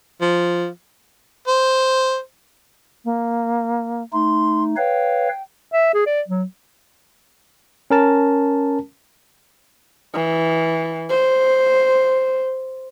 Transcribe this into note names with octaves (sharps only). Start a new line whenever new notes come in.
F3
C5
A#3
A3 D#4 C6
B4 C#5 F5 G5
E5
G#4
D5
F#3
C#4 A#4 A5
E3
C5